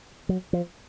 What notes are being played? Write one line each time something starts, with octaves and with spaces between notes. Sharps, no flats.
F#3
F3